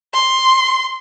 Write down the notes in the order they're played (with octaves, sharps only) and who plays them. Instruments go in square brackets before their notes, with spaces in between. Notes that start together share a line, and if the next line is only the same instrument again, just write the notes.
[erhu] C6